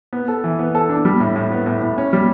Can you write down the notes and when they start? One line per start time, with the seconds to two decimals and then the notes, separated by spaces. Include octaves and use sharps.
0.13 B3
0.28 A4
0.44 E3
0.59 B3
0.75 A4
0.89 D4
1.05 G3
1.20 A2
1.36 A2
1.51 B3
1.66 A2
1.82 A2
1.98 C#4
2.13 G3